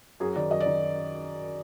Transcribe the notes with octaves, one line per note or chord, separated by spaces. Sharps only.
F#2 G#4
D#3 D5
F#2 D#5
D5
D#3